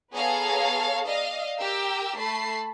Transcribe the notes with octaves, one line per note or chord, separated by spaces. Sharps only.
B3 G#4 A4 C#5 F5 A#5
D5 D#5 F5
G4 A#4 G5 E6
A3 A5 B5 C7